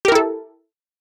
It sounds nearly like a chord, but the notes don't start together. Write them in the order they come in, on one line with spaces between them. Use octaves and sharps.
G4 A#4 E4 A4